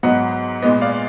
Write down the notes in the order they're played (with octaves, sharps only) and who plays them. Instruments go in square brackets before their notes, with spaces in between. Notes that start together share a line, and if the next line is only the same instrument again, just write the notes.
[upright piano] G#2 F#3 B3 D#5 F#5
A#2 G#3 B3 D#5
D5 F5